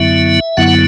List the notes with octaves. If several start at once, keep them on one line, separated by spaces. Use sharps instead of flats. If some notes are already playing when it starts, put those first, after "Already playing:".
Already playing: F#2 D3 F#3 B3 E4 E5
F#2 D3 F#3 B3 E4 F#5